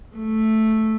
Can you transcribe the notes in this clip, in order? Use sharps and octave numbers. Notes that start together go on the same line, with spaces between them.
A3